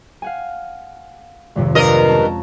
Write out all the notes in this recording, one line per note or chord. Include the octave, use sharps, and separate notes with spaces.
F5 F#5 G#5
G#1 F2 C3
G2 A#4 D5 D#5
C#4 A5 A#5